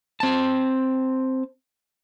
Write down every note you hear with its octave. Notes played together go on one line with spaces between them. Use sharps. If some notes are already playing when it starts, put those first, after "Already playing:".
C4 A5